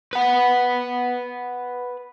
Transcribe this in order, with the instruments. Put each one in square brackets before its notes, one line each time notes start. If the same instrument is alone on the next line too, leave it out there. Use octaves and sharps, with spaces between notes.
[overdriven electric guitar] B4 F#5